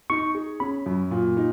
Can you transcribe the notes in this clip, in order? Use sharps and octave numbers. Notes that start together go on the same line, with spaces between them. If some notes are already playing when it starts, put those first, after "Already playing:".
D#4 C#6
G#4
C#4 B5
F#2
A#2
D#4